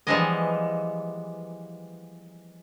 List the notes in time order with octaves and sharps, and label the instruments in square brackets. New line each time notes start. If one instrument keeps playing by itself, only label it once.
[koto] E3 F3 G3 G#3 B3 D#5